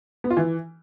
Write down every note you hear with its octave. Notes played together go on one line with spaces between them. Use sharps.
B3
F4
E3